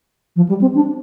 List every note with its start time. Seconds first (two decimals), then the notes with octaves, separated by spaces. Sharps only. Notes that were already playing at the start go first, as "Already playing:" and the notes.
0.36 F3
0.49 G3
0.61 C4
0.75 D4